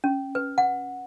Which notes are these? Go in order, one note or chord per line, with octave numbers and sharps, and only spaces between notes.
C#4
B4
F#5